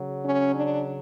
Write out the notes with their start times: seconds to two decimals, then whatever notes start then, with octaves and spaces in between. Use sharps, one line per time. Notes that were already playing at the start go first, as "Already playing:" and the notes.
Already playing: C#3 F#3
0.23 C#4
0.54 D4